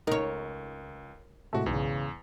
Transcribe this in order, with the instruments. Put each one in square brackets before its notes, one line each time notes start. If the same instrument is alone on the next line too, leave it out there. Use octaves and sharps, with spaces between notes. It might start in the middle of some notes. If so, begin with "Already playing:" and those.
[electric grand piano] C#2 [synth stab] D#4 [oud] A#4 C#5
[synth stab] A2 C3 A3 [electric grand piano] G#3 F#4
[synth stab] B1 G#2 [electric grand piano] E2 [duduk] C#3